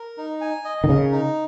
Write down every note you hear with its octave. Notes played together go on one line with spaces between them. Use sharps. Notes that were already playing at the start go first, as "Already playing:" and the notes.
Already playing: A#4
D#4
G#5
D#5
D#3
C#3 A#4
D#4